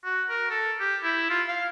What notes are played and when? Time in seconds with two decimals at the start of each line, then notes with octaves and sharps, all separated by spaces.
0.05 F#4
0.30 A#4
0.51 A4
0.80 G4
1.04 E4
1.30 F4
1.49 F5